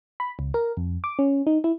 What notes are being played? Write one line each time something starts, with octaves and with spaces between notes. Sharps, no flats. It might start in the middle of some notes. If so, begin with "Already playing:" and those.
B5
C#2
A#4
F2
D6
C#4
D#4
E4